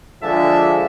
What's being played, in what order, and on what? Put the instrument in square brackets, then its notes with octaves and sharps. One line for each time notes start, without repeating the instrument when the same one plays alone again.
[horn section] D3 F3 G#3 D4 E5 A5